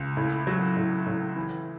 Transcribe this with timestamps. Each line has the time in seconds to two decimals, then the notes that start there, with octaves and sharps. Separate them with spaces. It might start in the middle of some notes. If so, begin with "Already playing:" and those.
Already playing: C#2
0.17 A2
0.47 F#3
0.77 A2
1.06 A2
1.36 E3